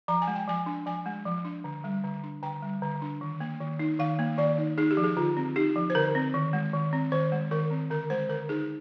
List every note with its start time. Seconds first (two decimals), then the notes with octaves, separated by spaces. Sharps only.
0.08 F3 A#5
0.22 G#5
0.27 G#3
0.35 G5
0.48 F3 G#5
0.66 D4
0.86 F3 G#5
1.06 G#3
1.25 F3
1.45 D4
1.64 D3
1.84 G3
2.04 D3
2.23 D4
2.43 D3 G5
2.62 G3
2.82 D3
3.02 D4
3.21 D#3
3.40 A#3
3.60 D#3
3.79 D#4
3.99 D#3 F5
4.19 A#3
4.38 D#3 D5
4.58 D#4
4.78 D#4 G#4
4.91 G4
4.97 F3
5.04 G#4
5.17 D3 F4
5.37 C4
5.56 D#4 G4
5.76 F3
5.90 C5
5.95 D3 A#4
6.15 C4
6.34 D#3
6.53 G#3
6.74 D#3
6.93 C4
7.12 D#3 C5
7.32 G#3
7.51 D#3 A#4
7.71 C4
7.90 D3 A#4
8.10 G#3 C5
8.29 D3 A#4
8.49 D#4 G#4